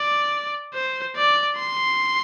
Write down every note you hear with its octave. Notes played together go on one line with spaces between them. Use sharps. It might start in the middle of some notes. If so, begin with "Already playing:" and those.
Already playing: D5
C5
D5
C6